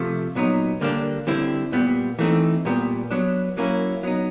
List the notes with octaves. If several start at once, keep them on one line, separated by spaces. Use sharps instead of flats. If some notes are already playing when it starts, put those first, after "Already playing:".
Already playing: C3 F3 A3
A#2 F#3 B3 D#4
D3 G3 A#3 D4
D3 G3 C4 E4
A#2 G3 B3
E3 A3 C4 D#4
A#2 G3 B3
F#3 B3 D4
F#3 A#3 C#4 E4
F#3 B3 D#4